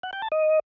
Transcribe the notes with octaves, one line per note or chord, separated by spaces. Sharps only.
F#5
G5
A5
D#5